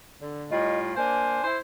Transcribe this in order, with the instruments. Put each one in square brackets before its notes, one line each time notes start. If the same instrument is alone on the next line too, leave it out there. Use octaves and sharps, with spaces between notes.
[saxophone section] D3
[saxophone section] A2 G3 F4 [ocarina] D#5
[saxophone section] A#3 D4 C5 [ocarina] G#5
[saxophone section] E4 C5